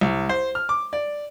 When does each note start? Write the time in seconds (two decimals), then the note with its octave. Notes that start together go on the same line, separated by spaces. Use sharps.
0.01 C2
0.29 C5
0.55 F6
0.69 D6
0.93 D5